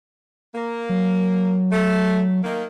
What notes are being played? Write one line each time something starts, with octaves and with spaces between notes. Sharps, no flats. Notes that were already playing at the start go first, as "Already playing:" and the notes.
A#3
F#3
A3
D#3 A#3